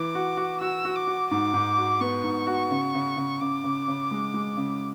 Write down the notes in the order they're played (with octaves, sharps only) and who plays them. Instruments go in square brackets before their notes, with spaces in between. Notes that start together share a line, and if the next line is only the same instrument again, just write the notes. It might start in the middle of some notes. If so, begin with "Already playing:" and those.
Already playing: [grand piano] E3 [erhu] D6
[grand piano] F#4
F#4
[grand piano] F#4 [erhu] E6
[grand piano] F#4
[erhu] D6
[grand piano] F#4
[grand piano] G#2 [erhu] D6
[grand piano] G#2
F#4
[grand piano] B3 [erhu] C#6
[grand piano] G#2
F#4
C#3
C#3
C#3
[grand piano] C#3 [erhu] D6
[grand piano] C#3
C#3
G#3
G#3
C#3